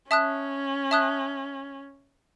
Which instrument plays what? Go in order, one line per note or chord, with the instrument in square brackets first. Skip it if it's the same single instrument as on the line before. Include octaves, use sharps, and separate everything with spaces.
[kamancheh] C#4 [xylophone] E5 A5 D#6 F#6
[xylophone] E5 A5 D#6 F#6